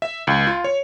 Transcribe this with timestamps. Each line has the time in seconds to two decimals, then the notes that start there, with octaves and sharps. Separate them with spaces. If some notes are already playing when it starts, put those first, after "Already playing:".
0.02 E5
0.27 C#2
0.47 F4
0.64 C#5